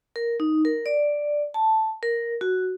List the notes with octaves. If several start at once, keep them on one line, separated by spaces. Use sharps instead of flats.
A#4
D#4
A#4
D5
A5
A#4
F#4